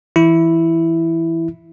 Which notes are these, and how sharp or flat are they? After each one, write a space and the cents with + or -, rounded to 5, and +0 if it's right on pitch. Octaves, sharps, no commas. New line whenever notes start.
E3 +0 E4 +0